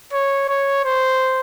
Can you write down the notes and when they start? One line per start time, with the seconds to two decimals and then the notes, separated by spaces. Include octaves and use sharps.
0.13 C#5
0.49 C#5
0.84 C5